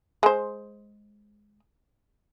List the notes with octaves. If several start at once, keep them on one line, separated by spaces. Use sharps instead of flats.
G#3 C5